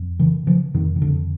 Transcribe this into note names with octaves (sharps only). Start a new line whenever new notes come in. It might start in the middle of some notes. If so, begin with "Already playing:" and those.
Already playing: F2
C#3 E3
C#3 F3
F2 D#3
D#3
F2 D3